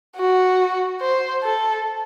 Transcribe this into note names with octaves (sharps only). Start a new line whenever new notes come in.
F#4
C5
A4